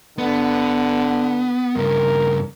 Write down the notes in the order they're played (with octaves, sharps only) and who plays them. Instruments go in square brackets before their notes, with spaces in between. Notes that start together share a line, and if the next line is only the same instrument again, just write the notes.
[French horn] D3 [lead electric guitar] B3
[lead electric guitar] G2 C#3 [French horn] A#4